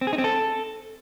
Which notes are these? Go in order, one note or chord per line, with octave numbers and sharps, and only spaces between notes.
C4
G#4
D#4
C4
A4